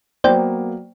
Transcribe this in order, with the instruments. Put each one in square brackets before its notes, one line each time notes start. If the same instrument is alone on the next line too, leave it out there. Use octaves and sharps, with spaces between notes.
[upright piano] F#3 A#3 B3 [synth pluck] C5 D5 G5